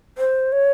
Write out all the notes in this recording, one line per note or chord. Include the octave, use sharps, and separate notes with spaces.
C5
C#5